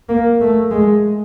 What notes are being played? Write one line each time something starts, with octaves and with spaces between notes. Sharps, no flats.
A#3
A3
G#3